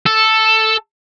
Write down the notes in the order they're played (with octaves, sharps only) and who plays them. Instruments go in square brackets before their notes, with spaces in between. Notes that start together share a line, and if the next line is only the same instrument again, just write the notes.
[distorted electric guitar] A4